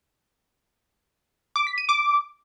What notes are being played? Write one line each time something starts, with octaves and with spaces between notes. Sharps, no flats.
D6
B6
D#7
D6